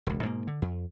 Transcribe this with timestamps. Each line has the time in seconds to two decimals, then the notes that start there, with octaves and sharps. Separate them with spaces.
0.07 E1 C#2
0.23 G#2 B2 G#3 A#3
0.47 D3
0.62 F2